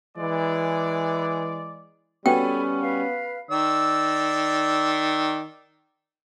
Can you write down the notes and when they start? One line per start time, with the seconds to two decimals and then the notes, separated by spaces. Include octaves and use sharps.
0.17 E3 G#3 D5
2.26 G3 B3 C#4 F#4 A4 G5 G#5 B5
2.80 B4 F5
3.51 D#3 D5 E6